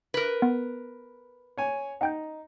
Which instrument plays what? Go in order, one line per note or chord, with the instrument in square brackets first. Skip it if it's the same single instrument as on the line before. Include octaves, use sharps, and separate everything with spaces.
[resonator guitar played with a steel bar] A#4 B4
[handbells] B3
[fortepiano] C#5 G#5
[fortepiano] D#4 [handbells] F#5 G5 G6